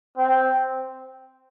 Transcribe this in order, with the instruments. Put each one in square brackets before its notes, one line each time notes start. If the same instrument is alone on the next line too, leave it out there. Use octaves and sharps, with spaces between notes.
[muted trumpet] C4